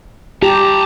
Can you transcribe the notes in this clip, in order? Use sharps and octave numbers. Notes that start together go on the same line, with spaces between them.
G4 A5 A#5